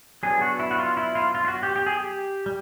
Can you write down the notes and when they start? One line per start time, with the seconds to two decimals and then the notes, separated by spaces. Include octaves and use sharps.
0.23 F#3 B3 D4 G#4
0.42 F#4
0.59 E4
0.71 F#4
0.78 F4
0.97 E4
1.15 F4
1.35 F4
1.45 F4
1.48 F#4
1.63 G4
1.76 G4
1.86 G#4
1.97 G4
2.46 G3